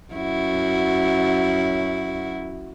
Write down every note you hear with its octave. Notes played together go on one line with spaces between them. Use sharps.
F#2 E4 F#4